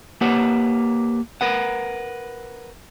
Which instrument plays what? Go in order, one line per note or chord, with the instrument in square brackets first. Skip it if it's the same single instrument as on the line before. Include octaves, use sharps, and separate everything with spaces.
[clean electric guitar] A#3 G4 B4 C#5 F#5
A#4 B4 F#5